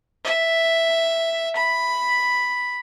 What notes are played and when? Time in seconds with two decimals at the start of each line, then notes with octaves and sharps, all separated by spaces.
0.25 E5
1.56 B5